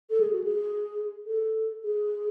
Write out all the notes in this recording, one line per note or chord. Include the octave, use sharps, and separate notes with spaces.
A4
G#4
F#4
G#4
A4
G#4